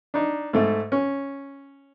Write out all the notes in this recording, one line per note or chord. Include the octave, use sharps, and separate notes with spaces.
D4 D#4
G#2 A3
C#4